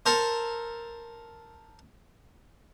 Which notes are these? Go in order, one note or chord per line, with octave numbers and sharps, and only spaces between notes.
A4 A#4 C5